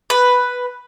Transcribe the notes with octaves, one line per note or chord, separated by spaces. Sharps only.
B4